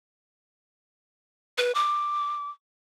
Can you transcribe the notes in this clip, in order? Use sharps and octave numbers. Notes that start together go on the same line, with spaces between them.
B4
D6